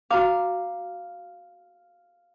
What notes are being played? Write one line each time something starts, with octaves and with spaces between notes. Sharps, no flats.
F#4 F5 A#5 D6